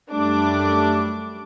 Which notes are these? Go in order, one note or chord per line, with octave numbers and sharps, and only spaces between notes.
F#2 G3 A3 D4 D6